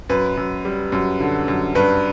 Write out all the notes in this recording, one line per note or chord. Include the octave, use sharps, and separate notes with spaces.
F#2 B4
F#2
G3
F#2
D3
F#2
G2 B4